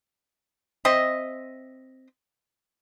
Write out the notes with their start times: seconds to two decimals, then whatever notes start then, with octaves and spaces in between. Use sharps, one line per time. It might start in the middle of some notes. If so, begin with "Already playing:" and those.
0.85 C4 D#5 E5